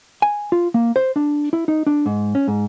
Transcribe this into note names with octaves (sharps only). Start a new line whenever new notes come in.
G#5
F4
A#3
C5
D4
E4
D#4
D4
G#2
C#4
G#2